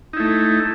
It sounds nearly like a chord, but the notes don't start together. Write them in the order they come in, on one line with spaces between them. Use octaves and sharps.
D#4 E4 A3